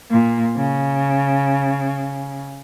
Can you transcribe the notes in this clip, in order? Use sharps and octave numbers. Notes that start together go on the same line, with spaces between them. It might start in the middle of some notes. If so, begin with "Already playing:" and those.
A#2
C#3